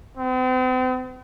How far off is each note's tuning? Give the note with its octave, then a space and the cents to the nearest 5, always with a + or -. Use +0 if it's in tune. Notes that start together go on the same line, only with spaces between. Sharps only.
C4 -40